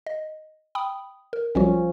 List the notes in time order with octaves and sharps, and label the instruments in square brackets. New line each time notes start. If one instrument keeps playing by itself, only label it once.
[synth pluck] D#5
G5 B5 D#6
A#4
[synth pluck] B1 G3 F#4 [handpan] F3 C#4